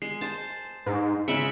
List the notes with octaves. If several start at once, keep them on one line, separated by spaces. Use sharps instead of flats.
G#3 C7
C5 A5
G#2
C#3 G#3 E5 C#7 F#7